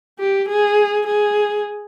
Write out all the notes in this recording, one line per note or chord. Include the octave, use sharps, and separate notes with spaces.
G4
G#4
G#4